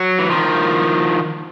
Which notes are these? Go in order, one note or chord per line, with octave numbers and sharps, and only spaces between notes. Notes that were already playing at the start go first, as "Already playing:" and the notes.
Already playing: F#3
E3
D#3 F3